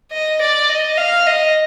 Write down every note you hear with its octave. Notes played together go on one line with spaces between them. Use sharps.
D#5
D5
D#5
F5
D#5